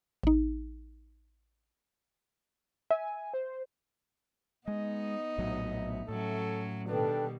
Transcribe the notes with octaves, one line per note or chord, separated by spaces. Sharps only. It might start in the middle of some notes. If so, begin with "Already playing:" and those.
A1 D#4
E5 G#5
C5
G#3 B3 D#4 D#5
A#1 A2 F#3 E5
A2 F#3 C#4 A4
B2 D#3 G3 D4 A4 B4 G5